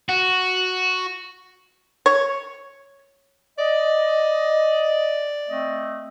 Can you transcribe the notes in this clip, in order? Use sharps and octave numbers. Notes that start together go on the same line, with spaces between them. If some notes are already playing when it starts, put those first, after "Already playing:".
F#4
C#5
D5 D#5
A3 C4 D#5